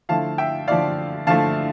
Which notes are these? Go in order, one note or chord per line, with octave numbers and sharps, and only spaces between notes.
D3 F3 A3 E4 F5 A5
E5 G5
D3 F3 A3 E4 D5 F5
D3 F3 A3 E4 F5 A5